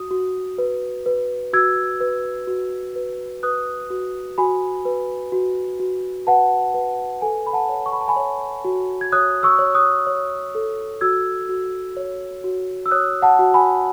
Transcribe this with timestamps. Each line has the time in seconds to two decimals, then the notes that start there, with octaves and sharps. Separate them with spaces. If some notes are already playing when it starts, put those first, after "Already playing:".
Already playing: F#4 D#6
0.11 F#4
0.58 B4
1.06 B4
1.53 F#4 E6 G#6
2.00 B4
2.47 F#4
2.96 B4
3.43 B4 D#6 F#6
3.90 F#4
4.38 F#4 G#5 B5
4.85 B4
5.32 F#4
5.80 F#4
6.27 B4 F#5 A5
6.74 B4
7.22 A4 G#5
7.47 B5
7.53 F#5 A5
7.69 C#5
7.86 C#6
7.93 B5
8.01 A5
8.08 G#5 B5
8.16 C#5
8.65 F#4
9.01 G#6
9.12 C#5 D#6 F#6
9.43 C#6 E6
9.59 C#5
9.75 D#6 F#6
10.07 C#5
10.55 A4
11.01 F#4 E6 G#6
11.49 F#4
11.97 C#5
12.44 F#4
12.86 E6
12.91 C#5 D#6 F#6
13.22 F#5 A5
13.39 F#4
13.54 G#5 B5